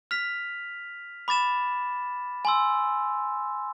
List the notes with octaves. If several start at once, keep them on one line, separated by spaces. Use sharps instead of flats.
F6 B6 F7
B5 D6 A6 E7
G#5 C6 E6